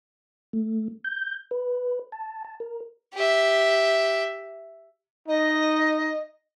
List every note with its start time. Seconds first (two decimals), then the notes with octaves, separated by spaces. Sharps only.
0.53 A3
1.04 G6
1.51 B4
2.12 A5
2.45 A5
2.60 A#4
3.14 G4 E5
5.28 D#4 D#5